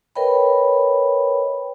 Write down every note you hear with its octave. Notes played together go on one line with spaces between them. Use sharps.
A#4 B4 C#5 D#5 G5 B5